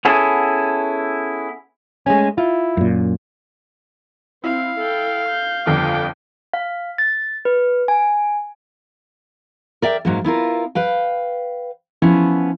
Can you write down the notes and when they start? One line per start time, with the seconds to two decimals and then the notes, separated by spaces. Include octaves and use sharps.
0.05 B3 C#4 E4 G#4 A4
2.06 G#3 A3 C#4 G#5
2.38 E4 F4
2.77 F#2 A#2
4.44 C4 E4 F5
4.79 A4 G5
5.29 G6
5.66 G1 F2 F4 G5 D6
6.53 F5
6.98 A6
7.45 B4
7.88 G#5
9.82 A#4 D5 E5 G5
10.05 G#2 F#3 A#3
10.24 B3 E4 F4 A#4
10.75 B4 F5 G5
12.02 F3 B3 C#4 E4